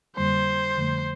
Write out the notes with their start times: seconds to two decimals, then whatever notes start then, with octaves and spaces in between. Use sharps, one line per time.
0.16 F2 D3 G3 A#3 C5
0.77 F2 D3 F3 A3